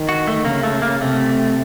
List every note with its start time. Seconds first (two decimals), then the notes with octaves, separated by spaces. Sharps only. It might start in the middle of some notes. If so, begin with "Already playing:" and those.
Already playing: D#3
0.09 F#4
0.27 A3
0.45 C#3 A#3
0.63 A3
0.82 A#3
1.01 C3 A3